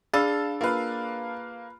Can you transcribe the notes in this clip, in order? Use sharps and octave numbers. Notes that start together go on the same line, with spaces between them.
D4 G#4 F5 A5 B5 E6 A6
A#3 F4 B4 F5